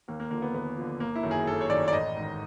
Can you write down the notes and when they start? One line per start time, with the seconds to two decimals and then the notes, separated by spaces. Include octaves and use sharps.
0.08 D#2 A#3
0.20 A#3
0.31 D3 F3 A#3
0.42 B3
0.54 D#2 B3
0.77 D3 F3
1.00 G1 A#3
1.16 E4
1.23 F#2 D#3
1.31 G#4
1.47 G1 A4
1.61 C#5
1.69 F#2 D#3 D5
1.88 D5
1.93 A1 D#5
2.16 G#2 D#3